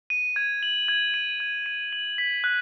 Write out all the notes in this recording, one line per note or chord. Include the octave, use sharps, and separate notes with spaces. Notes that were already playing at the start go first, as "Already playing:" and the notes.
D#7
G#6
F#7
G#6
D#7
G#6
D#7
F#7
B6
F#6